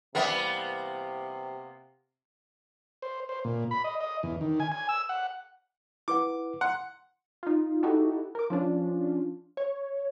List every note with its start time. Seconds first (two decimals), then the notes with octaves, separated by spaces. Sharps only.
0.15 C3 E3 G3 A#3 B3 E5
3.02 C5
3.29 C5
3.44 A#2
3.71 B5
3.84 D#5
4.01 D#5
4.23 E2
4.41 D#3
4.60 G#5
4.72 G#5
4.89 E6
5.09 F#5
6.08 E4 B4 F#5 D6
6.61 F#5 C6
7.43 D#4 F4
7.83 D#4 E4 F#4 G4 A4
8.35 A#4 D6
8.50 F3 C#4 D4 F4
9.57 C#5